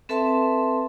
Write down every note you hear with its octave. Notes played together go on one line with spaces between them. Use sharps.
C4 A4 B4 E5 A5 C6